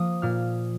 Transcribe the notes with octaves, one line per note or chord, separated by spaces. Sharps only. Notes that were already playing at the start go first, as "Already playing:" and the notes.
Already playing: F3 A#3 D#6
A#2 F6